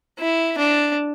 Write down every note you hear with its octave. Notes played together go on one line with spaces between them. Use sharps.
E4
D4